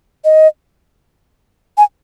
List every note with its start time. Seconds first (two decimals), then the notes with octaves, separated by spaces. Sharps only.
0.25 D#5
1.78 G#5